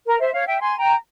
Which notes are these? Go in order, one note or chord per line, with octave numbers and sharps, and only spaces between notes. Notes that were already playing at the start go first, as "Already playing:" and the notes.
A#4
C5 E5
C#5 F5
E5 G5
G#5 C6
G5 A#5